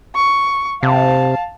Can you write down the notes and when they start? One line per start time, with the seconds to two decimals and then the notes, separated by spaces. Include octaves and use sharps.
0.15 C#6
0.83 C3 F5 A5